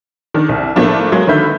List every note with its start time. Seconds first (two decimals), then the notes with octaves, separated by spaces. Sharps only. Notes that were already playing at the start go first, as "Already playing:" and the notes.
0.34 D#3 D4
0.49 C2
0.76 A2 F3 A3 A#3 D4 F4
1.12 F#3 G#3 A#3
1.27 D3 D#3 B4 E5 G6